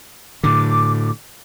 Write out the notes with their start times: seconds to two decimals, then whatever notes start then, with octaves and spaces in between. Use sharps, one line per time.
0.43 A2 D3 D6